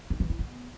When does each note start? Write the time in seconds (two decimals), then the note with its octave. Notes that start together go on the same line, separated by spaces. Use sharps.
0.10 D#4
0.20 E3
0.30 E4
0.39 B3